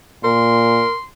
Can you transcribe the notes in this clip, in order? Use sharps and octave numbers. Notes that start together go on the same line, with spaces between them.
A#2 A#4 C6